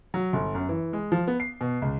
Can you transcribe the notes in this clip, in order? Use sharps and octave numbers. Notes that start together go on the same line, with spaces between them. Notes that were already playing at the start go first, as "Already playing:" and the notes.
F#3
G1
F#2
E3
G#3
F3
B3
C7
B2
C#2